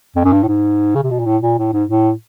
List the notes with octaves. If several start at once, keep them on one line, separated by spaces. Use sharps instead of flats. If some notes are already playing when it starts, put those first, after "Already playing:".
F2
F#2
G2
A2
G#2
C#3
C3
B2
A#2
A2
A#2
A2
G#2
A2